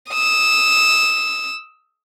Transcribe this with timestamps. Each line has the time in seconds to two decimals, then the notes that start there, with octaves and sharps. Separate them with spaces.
0.11 D#6 E6